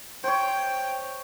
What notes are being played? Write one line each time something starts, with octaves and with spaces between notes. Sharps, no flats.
C5 C#5 G5